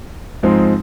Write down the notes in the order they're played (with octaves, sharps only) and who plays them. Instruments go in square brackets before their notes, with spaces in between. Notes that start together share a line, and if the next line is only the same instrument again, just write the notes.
[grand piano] G#2 F3 G#3 C4 D#4